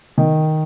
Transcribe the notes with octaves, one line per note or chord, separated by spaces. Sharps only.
D#3